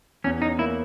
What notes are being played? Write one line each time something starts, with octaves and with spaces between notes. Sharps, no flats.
E2 C#4
C#4 D#4
A#3 E4